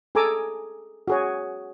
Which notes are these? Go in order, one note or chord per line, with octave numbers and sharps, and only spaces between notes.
G#4 A4 G#5 A#5 D6 E6
F#4 G#4 C#5